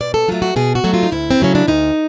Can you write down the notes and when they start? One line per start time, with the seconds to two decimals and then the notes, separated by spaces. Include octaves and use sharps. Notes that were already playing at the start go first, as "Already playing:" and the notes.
0.01 B2 D5
0.14 A4
0.28 F#3 A3 F4
0.42 F#4
0.56 B2 G#4
0.75 F#4
0.84 F#3 A3
0.94 F4
1.03 D#4
1.12 D2 E4
1.31 C4
1.40 C#3 F#3 A3 C#4
1.55 D4
1.67 D2 D#4